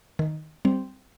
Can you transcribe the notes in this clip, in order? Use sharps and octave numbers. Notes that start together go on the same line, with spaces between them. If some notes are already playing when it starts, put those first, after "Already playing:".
D#3
G3 C4